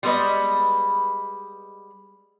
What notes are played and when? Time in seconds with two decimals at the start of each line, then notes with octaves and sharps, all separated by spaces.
0.03 G3 G#3 B3 G#4 B4 D#5